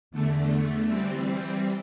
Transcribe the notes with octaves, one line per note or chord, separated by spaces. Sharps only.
E2 D3 A3
E3 G3 C4